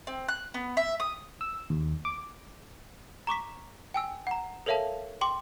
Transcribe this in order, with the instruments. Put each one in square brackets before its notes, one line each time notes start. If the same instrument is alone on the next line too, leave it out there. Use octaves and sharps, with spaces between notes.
[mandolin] C4
F#6
B3
E5
D#6
[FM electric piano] E6
D#2
D6
[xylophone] A#5 C#6 D6 B6
G5 G#5 E6
F#5 A#5
A4 A#4 C#5 E5 F5 A5
G5 C6 D6